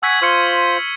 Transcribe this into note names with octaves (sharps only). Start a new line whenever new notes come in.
F#5 G#5 C#6 E6 G#6 B6
F4 C5 C#6 F6 C#7